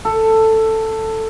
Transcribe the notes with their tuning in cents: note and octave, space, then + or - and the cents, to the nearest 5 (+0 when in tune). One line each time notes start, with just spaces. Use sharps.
A4 +10